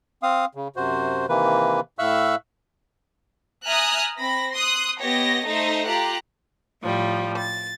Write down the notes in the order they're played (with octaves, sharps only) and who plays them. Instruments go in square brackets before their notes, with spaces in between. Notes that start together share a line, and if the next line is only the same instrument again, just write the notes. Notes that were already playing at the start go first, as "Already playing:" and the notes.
[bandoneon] C4 F5 D#6
C#3
F#2 C3 F#4 C5
C3 D#3 E3 A#3 B4
A2 E5 F5 C#6 E6 F#6
[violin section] E5 G#5 A#5 D#6 F6 F#6
C4 B5 A#6
C6 D#6 F#6
B3 G4 C#5 D#5 A#6
A3 D#4 C5 E5 A#6
F4 G4 A#5 F#6
[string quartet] A2 F3 G3
A6